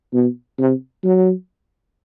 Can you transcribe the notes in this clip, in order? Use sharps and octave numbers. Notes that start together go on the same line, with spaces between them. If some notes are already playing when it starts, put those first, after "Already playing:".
B2
C3
F#3